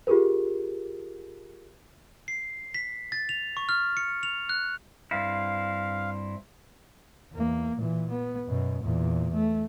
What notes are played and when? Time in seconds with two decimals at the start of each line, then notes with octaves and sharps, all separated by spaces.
0.07 F4 G4 G#4 A#4 B4
2.28 C7
2.74 B6
3.12 A6
3.29 F7
3.57 C#6
3.69 F6
3.97 C#7
4.23 F7
4.49 F#6
5.11 G2 C4 E4 F5
7.33 E2 A#3
7.77 A#2 E3
8.10 B3
8.48 F#2 B2
8.82 E2 A#2
9.33 A3